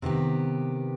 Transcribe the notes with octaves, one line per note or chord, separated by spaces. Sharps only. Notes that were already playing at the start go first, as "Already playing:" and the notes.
C3 D#3 B3 G4